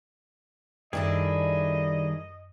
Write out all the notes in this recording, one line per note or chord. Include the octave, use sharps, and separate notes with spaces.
F#2 D#3 G3 D4 E4 G#4 A4 D#5